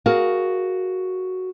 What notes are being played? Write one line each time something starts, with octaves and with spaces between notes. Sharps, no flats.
F#4 G#4 A#4 F5